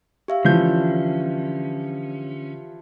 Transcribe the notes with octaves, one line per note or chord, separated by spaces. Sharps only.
G4 E5 F5
D3 E3 F3 C#4 D4 G6